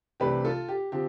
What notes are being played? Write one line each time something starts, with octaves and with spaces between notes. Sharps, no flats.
C2 C3 E3 A3 D4 G4 B4
F4 A4
G4
D3 F3 C4 G4